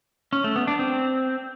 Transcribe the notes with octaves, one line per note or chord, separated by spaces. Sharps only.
C#4
A3
B3
D4
C4